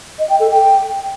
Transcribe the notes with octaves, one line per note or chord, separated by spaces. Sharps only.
D#5
G5
A4
G5